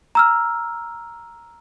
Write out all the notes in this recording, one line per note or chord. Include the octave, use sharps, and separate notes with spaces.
A#5 E6 F6